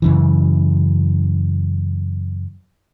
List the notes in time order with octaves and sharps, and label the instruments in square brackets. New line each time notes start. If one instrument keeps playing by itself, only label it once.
[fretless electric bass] F#2 C#3 E3